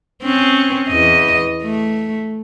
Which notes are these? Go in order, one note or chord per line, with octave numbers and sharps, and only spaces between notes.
C4 C#4
E2 D#5
A3